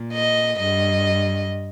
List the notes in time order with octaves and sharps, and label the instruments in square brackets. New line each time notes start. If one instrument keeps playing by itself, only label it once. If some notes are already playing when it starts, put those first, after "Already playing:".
Already playing: [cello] A#2
[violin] D#5
[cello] G2 [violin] D#5